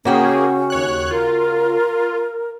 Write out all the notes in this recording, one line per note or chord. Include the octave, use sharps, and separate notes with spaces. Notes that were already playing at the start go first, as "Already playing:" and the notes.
C#3 A#3 C#4 F#4 G#4 G5
D#2 C#5 F#6
F4 A#4